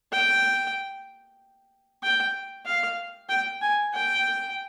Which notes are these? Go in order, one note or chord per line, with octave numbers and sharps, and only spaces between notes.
G5
G5
F5
G5
G#5
G5